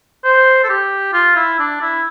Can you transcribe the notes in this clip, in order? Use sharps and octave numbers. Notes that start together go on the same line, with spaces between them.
C5
A4
G4
F4
E4
D4
E4